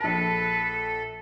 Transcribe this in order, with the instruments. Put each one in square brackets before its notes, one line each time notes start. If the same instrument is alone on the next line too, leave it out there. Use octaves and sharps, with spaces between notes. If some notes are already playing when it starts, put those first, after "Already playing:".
[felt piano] A#1 A5 [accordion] A4 [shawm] B4